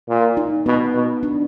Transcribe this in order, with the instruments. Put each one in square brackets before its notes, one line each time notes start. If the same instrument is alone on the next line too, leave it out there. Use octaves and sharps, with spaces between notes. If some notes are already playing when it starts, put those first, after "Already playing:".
[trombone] A#2
[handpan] D#4
[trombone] B2 [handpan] B3
[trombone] B2
[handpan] D4